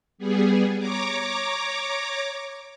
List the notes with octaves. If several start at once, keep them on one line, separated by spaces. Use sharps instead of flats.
G3 B3 G#4
C#5 A#5 D6